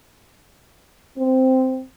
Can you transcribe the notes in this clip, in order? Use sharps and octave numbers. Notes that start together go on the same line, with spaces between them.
C4